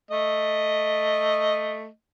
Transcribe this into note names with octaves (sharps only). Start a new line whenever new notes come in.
A3 D#5